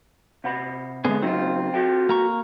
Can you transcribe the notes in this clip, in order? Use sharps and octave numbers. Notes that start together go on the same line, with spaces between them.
C3 F#5 B5
D3 G#3 B3 C4 G#4
C#3 F#3 C4 D#4 F4
F#4 A4 G5
A#3 A#5 C#6